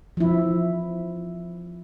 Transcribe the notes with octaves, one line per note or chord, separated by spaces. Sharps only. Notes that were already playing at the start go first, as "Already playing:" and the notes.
F3 E4